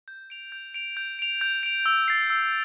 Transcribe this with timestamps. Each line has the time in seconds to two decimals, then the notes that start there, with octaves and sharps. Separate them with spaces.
0.08 G6
0.30 D7 F7
0.52 G6
0.74 D7 F7
0.97 G6
1.19 D7 F7
1.41 G6
1.63 D7 F7
1.86 E6
2.08 A6 C7
2.30 E6